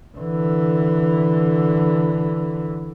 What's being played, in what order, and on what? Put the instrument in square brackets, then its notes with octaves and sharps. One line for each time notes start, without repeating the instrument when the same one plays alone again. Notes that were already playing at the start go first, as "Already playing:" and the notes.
[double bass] D3 E3